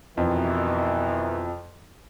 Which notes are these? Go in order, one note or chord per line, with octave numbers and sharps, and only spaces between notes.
F2 B2 D#3 E3